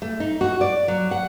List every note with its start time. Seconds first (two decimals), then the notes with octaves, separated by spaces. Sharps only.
0.02 A3
0.20 D#4
0.41 F#4
0.61 D5
0.88 F#3
1.11 F#5